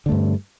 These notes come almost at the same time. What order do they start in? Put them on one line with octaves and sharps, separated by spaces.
D3 A3 G2